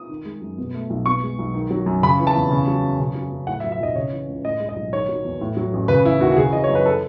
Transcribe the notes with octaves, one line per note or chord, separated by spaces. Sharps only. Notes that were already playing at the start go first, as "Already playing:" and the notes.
Already playing: D#6
D#3
G#3
F#2
B2
A3
B1
B2 C#6
G#3
B1
D#3
F#3
F#2
C#3 B5
E3
A5
E2
C#3
F#3
F#2
C#3
F#3
F#2
A2 F#5
E5
F#3
E5
B1 D#5
C#3 C#5
E3
C#2
A2 D#5
G#3
D#5
B1
D#3 C#5
F#3
E2
A2
F#3
A1
C#3 B4
E3 E4
D#2 F#4
F#4
C#3 G#4
E3 D#5
C#5
F#2
B4
A4